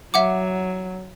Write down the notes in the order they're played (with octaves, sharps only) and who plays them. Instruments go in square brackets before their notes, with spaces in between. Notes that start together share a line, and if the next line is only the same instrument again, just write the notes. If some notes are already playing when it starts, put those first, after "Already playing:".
[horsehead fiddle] F#3 [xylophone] E5 F#5 D6